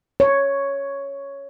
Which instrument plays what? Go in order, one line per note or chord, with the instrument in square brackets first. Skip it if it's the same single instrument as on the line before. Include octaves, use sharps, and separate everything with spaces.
[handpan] C#5